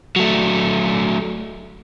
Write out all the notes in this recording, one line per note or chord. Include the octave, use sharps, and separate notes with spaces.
F#3 A3